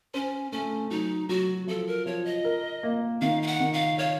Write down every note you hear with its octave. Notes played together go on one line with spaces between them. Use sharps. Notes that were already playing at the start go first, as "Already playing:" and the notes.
C#4 C5
A3 C#4
F#3 D#4
F#3 F#4
F3 A4
A#4
F3 C#5
D#5
A#4
A#3
D#3 F5
F5
F#5
D#3
F5
C#5 F5